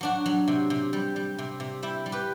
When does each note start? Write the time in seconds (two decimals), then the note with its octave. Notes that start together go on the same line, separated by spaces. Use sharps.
0.01 F#3 D4 F#4
0.26 F#3
0.48 C3
0.70 C3
0.93 G3
1.16 G3
1.38 C3
1.60 C3
1.83 G3 E4 G4
2.06 G3
2.12 G4 B4